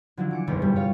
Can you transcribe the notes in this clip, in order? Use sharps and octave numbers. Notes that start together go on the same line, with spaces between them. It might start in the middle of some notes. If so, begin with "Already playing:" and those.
D3 D#3 F3 F#3 D4 E4
E3 D6 C#7
F#1 B1 E2 C#4 C6
G2 C3 G3
F4 C#5 F5